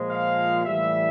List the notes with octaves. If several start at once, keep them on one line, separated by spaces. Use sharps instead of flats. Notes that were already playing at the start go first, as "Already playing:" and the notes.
Already playing: A#2 F3 G#3
F5
A2 E3 G3 E5